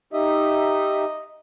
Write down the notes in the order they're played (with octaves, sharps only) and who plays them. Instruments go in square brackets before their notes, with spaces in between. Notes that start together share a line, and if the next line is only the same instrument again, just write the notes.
[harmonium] D#4 G4 E5 [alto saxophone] D#5